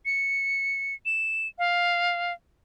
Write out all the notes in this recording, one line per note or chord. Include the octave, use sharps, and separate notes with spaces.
C#7
E7
F5